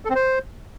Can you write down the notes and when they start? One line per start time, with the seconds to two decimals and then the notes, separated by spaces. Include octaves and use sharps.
0.05 A4
0.10 C4
0.16 C5